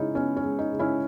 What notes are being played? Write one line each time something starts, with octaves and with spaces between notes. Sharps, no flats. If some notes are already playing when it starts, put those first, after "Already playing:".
Already playing: C#3 G#3 C#4 D#4 E4
B3 C#4
C#4
G#3
D#4
C#3
C#4 E4